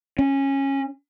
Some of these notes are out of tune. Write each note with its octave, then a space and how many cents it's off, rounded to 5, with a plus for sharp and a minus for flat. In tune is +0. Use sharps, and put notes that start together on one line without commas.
C#4 -15